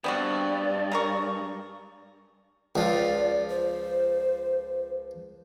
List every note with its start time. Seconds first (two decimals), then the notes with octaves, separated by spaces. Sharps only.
0.04 D2 G2 B3 C4 F#4 D5
0.92 C#3 A#4 C#6
2.76 C#2 F3 D5
3.50 C5